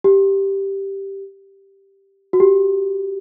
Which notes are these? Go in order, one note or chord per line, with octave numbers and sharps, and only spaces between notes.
G4
F#4
G4